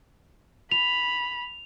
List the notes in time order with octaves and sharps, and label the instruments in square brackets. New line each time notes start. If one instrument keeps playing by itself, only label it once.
[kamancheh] B5 [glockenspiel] F7